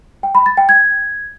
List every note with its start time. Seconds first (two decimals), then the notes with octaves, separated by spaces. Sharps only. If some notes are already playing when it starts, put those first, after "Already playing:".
0.23 G5
0.35 B5
0.46 A6
0.57 G5
0.69 G#6